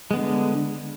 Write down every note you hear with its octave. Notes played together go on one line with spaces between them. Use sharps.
D3 G#3 B3